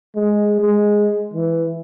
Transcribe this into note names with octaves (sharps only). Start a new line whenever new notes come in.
G#3
G#3
E3